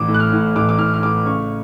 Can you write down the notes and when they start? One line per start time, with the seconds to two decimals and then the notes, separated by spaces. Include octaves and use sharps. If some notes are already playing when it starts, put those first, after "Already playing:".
Already playing: A1 D6
0.08 A2
0.14 F#6
0.20 F6
0.32 A2
0.56 A1 D6
0.69 D6
0.78 A2 F6
0.94 F6
1.03 A2 D6
1.26 C#3 C#6